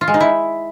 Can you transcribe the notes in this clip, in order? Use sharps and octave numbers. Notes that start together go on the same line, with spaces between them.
F4
G#3
D#4
E4